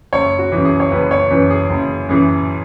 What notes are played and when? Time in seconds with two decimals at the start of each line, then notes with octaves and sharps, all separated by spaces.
0.13 F#1 C#5
0.39 F#4
0.52 F#2 E3
0.65 G#4
0.80 C#5
0.91 F#1 B4
1.11 C#5
1.31 F#2 E3 B4
1.50 G#4
1.70 F#1
2.09 F#2 E3 G#4